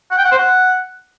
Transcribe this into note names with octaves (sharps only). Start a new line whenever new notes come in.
F#5
G5
F#5
C5
F#5